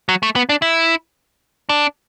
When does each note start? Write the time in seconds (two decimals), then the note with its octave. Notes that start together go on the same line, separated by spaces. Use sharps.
0.09 F#3
0.23 A3
0.36 B3
0.49 D4
0.62 E4
1.69 D4